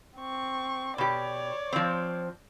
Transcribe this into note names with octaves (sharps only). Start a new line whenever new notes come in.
C4 C#6
B2 G4 C#5 D5
F3 C4